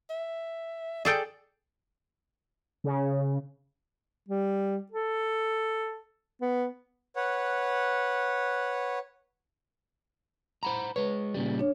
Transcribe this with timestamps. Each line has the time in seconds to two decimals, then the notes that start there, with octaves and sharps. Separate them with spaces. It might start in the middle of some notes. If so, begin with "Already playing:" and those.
0.10 E5
1.05 G#4 A4 D5 G5
2.84 C#3
4.28 G3
4.91 A4
6.41 B3
7.16 B4 C#5 F#5
10.63 C5 F#5 A#5 B5
10.96 G#3 B4 C#5
11.34 A#2 C#3 G3
11.59 D4 C#5